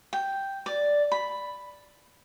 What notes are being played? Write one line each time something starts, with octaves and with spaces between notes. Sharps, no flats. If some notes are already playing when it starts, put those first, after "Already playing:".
G5
D5
B5